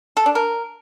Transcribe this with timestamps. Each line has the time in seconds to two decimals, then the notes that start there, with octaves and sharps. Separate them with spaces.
0.17 A4
0.26 D4
0.35 A#4